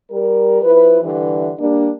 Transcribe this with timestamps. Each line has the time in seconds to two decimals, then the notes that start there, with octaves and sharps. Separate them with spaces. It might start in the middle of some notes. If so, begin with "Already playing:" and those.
0.11 G3 A#4
0.62 F3 E4 B4
1.02 G2 D3 E3
1.58 G3 A#3 D4